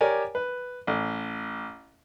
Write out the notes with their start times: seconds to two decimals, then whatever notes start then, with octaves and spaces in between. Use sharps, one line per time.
0.01 G4 A#4 C#5 D5 G#5
0.35 B4
0.87 A1